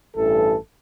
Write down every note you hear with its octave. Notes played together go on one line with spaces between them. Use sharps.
A1 G2 E3 A4